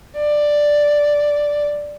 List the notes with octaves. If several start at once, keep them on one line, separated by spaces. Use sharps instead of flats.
D5